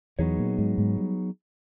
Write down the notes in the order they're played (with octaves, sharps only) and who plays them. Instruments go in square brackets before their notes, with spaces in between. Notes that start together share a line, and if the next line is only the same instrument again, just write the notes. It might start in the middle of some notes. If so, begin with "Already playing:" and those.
[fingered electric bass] E2 E3 [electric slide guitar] F#3 B3 D#4 G#4 C#5
[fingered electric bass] A#2 A#3
G#2 G#3
G#2 G#3
G3